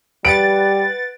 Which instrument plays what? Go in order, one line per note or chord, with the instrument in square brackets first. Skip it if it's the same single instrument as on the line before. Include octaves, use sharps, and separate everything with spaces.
[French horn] G3 [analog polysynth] B4 F#5 A6 [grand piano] D7